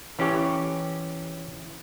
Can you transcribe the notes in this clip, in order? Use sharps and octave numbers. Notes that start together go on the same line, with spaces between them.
E3 C#4 G4 C#5